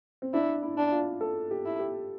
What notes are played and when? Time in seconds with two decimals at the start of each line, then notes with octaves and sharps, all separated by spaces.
0.22 C4
0.34 D4 E4
0.62 E4
0.78 D4
0.92 F4
1.21 A4
1.51 G4
1.66 E4
1.79 G4